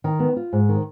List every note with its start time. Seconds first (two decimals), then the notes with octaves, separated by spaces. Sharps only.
0.04 D#3
0.20 B3
0.36 F4
0.53 G#2
0.69 D#3